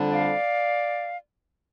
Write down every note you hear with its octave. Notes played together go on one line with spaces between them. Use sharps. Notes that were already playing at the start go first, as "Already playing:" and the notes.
Already playing: F2 D3 G3 D4
D5 F5